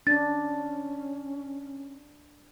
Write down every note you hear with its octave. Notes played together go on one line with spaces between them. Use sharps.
C#4 D4 A6